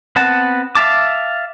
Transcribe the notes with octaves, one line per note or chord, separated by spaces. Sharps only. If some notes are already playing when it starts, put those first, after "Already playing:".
B3 C4 B4 F#5 A5
E5 F5 A5 D6